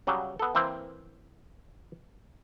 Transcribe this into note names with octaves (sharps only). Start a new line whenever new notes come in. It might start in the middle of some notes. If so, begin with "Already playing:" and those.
C#3 F#3 G3
B3 A4
E3 A#3 C4 E4 C5